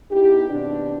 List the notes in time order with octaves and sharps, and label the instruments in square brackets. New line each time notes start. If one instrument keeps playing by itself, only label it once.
[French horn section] B3 D#4 E4 G4
B2 D#3 C4 D4